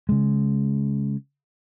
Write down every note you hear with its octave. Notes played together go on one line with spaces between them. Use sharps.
C#3 G#3